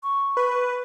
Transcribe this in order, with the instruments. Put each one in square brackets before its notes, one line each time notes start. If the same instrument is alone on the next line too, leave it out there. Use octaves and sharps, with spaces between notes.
[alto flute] C#6
[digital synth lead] B4